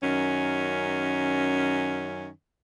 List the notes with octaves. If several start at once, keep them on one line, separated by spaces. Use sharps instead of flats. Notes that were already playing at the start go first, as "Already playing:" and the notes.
F#2 D#3 C#4